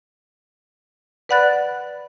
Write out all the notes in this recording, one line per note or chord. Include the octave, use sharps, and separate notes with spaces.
B4 D5 F#5 B5 F#6 A6